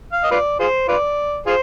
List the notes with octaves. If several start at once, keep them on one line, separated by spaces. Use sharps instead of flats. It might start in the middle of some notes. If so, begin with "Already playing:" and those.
F5
D#5
F4 B4 D5
F4 G#4 C5
F4 B4 D5
F4 G#4 C5